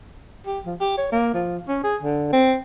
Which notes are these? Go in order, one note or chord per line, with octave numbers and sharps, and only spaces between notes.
G4
F3
G4
C#5
A#3
F3
C#4
G#4
D3
C4